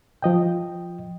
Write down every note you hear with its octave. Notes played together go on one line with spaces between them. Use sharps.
F3 D#5 G5